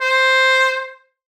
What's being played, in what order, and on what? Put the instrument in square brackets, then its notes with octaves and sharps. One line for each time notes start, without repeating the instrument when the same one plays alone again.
[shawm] C5